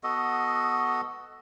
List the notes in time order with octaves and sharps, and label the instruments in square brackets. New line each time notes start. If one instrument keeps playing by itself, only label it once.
[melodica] B3 F#4 A4 D#5